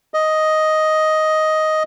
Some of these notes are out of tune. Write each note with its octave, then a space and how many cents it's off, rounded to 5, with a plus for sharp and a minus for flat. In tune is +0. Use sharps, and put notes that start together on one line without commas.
D#5 +5